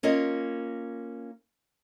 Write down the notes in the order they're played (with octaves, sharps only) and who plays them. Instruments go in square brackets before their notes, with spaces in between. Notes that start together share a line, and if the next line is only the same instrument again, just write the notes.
[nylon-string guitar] A#3 C#4 F4 A#4 D#5